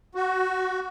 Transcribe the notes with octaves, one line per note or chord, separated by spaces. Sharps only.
F#4